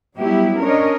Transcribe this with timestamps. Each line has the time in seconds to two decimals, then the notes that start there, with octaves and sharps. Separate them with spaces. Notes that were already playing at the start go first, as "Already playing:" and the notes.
0.17 F#3 G3 B3 E4 G4
0.61 C#4 D4 A#4 C#5 D#5